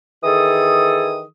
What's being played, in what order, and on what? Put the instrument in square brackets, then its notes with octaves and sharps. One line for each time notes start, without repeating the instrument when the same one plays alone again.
[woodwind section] D#3 E3 G#4 A4 D#6